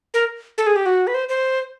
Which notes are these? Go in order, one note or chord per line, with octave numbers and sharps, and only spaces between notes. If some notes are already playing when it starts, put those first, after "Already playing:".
A#4
A4
G#4
G4
F#4
B4
C5
C5